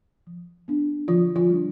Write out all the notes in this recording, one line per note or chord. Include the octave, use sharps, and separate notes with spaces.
F3
B3 D4
D3 F3 F4
F3 F4
G3 D4